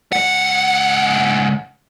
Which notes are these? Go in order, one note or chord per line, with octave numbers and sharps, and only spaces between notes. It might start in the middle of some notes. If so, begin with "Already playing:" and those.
C#2 F#5